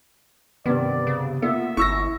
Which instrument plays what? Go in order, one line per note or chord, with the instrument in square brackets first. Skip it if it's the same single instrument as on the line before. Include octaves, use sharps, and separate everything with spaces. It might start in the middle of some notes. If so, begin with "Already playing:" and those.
[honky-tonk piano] G2 C3 B3 [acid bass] D#3 [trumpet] D5
[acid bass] C#3
[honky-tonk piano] A#3 F4 [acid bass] B3 [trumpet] E5
[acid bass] G1 [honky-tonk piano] E4 [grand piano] C#6 E6 A#6